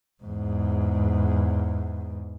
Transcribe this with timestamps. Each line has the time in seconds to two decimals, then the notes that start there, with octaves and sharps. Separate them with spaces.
0.23 E2 G#2